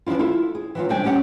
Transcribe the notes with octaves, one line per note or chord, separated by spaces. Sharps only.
E3 F3 D4 E4 F4
E4 F4 A4
G#4
E3 F#3 F4
C3 G3 D4 G5 G#5
G3 C#4 G4 F#5